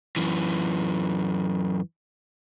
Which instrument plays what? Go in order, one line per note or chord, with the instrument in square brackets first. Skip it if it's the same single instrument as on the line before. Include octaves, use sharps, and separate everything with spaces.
[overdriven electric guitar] F#2 E3